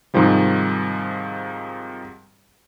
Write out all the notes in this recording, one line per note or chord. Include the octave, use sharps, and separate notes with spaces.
G#2 C3 D#3 F3 G3